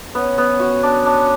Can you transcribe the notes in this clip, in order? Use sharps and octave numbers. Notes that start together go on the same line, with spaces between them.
B3 C#4
B3
F#4
D4
D4